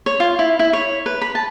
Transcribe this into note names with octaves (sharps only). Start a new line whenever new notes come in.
C#5
F4
E4
E4
C#5
B4
B5
A5